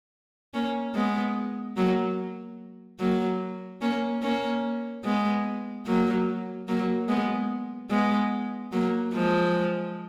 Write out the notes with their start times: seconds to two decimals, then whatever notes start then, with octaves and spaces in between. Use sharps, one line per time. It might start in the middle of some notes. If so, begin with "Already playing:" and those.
0.54 A#3 C#4
0.95 G#3 B3
1.77 F#3 A#3
3.00 F#3 A#3
3.82 A#3 C#4
4.23 A#3 C#4
5.04 G#3 B3
5.86 F#3 A#3
6.68 F#3 A#3
7.09 G#3 B3
7.90 G#3 B3
8.72 F#3 A#3
9.14 F3 G#3